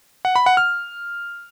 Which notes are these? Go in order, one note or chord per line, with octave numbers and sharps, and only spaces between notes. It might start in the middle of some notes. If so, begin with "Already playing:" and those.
F#5
B5
F#5
F6